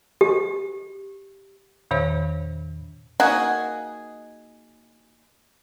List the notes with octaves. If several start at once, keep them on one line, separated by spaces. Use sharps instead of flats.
G4
E2 A#2 D#3 C5 C#5 E5
A#3 D#4 F#4 G#4